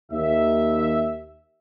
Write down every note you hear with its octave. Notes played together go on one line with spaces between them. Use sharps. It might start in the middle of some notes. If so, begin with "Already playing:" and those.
D#2 E5